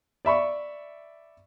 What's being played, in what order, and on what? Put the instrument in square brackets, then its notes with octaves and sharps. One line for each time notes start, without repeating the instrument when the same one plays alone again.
[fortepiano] D5 E5 B5 C#6